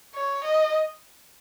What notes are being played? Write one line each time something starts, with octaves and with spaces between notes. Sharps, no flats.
C#5
D#5